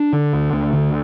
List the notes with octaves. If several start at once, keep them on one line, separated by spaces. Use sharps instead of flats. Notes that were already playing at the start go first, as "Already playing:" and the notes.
Already playing: D4
D3
D2
D2
D3